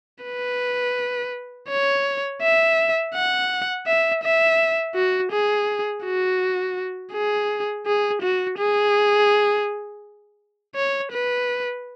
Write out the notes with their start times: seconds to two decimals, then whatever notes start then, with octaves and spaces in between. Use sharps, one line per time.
0.25 B4
1.70 C#5
2.42 E5
3.14 F#5
3.87 E5
4.24 E5
4.95 F#4
5.32 G#4
6.04 F#4
7.13 G#4
7.86 G#4
8.22 F#4
8.58 G#4
10.76 C#5
11.12 B4